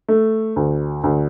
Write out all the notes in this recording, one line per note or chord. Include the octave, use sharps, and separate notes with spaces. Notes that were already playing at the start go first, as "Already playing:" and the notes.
A3
D2
D2